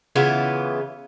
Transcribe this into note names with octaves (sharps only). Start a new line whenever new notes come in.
C#3 E3 B3 F4